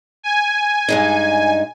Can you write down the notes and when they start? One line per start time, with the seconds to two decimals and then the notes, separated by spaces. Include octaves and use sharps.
0.23 G#5
0.88 G2 G#3 D#4